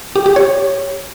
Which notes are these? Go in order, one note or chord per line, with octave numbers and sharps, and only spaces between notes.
G4
G4
C#5